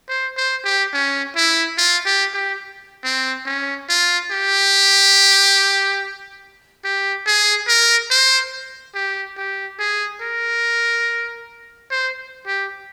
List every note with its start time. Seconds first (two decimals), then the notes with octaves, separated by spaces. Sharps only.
0.09 C5
0.37 C5
0.65 G4
0.93 C#4
1.36 E4
1.78 F4
2.05 G4
2.34 G4
3.04 C4
3.46 C#4
3.89 F4
4.31 G4
6.84 G4
7.26 G#4
7.68 A#4
8.10 C5
8.95 G4
9.37 G4
9.79 G#4
10.21 A#4
11.91 C5
12.47 G4